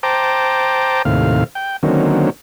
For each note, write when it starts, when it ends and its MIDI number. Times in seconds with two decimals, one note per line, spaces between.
0.03 1.02 72
0.03 1.02 79
0.03 1.02 81
0.03 1.02 82
0.03 1.02 86
1.05 1.44 39
1.05 1.44 45
1.05 1.44 48
1.05 1.44 77
1.55 1.77 79
1.83 2.30 50
1.83 2.30 51
1.83 2.30 54
1.83 2.30 58
1.83 2.30 60
1.83 2.30 61